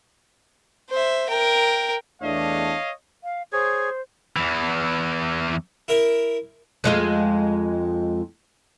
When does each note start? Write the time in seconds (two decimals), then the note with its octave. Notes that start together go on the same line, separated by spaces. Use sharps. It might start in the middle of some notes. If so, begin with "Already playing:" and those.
0.90 C5 E5
1.29 A#4 G5
2.22 E2 A3 D4 C#5 D#5 F5
3.24 F5
3.53 G#4 C5 C#5
4.36 E2 E3
5.88 E4 A#4 E5
6.84 F2 G#3 F4